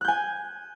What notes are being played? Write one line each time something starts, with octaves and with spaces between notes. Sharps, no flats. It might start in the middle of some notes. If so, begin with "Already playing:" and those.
G#5 F#6 G6